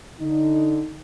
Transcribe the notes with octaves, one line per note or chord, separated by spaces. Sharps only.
D3 D#4